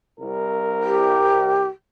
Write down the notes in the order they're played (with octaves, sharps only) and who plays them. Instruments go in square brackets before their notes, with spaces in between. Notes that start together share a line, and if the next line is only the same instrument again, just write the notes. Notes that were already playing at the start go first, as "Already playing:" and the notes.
[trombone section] C2 A#4
[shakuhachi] G4